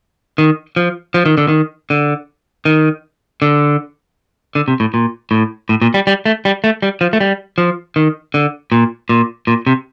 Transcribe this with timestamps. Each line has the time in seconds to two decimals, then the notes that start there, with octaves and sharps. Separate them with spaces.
0.38 D#3
0.76 F3
1.14 F3
1.26 D#3
1.38 D3
1.48 D#3
1.90 D3
2.65 D#3
3.42 D3
4.55 D3
4.68 C3
4.80 A2
4.94 A#2
5.31 A2
5.69 A2
5.82 A#2
5.94 G3
6.07 G3
6.26 A3
6.45 G3
6.64 A3
6.82 G3
7.01 F3
7.13 A3
7.21 G3
7.58 F3
7.96 D#3
8.34 D3
8.72 A#2
9.09 A#2
9.47 A#2
9.67 C3